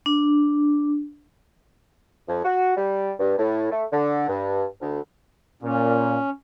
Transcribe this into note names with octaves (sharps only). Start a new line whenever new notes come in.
D4
F2
F#4
G3
G2
A2
A3
D3
G2
D2
A#2 C#4